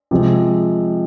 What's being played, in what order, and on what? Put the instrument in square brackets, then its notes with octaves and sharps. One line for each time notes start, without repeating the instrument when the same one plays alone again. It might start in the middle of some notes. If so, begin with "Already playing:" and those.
[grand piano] C3 F3 G#3 C4